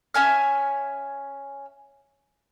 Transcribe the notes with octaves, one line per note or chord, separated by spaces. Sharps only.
C#4 E5 G#5 F6